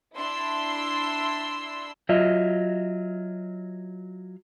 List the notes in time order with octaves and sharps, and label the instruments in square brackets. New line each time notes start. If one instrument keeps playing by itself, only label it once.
[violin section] D4 E4 C6 E6 C7
[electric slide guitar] F#3 F4 D#5 E5